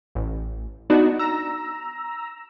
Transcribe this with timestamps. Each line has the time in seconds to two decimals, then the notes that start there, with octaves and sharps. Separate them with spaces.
0.15 A1
0.90 B3 D4 D#4 F#4
1.19 A#5 E6